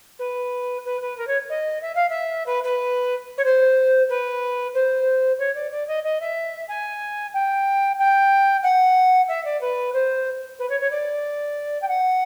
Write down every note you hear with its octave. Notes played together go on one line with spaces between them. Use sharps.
B4
B4
B4
A#4
C#5
D#5
E5
F5
E5
B4
B4
C#5
C5
B4
C5
C#5
D5
D5
D#5
D#5
E5
G#5
G5
G5
F#5
E5
D5
B4
C5
B4
C#5
C#5
D5
G5
F#5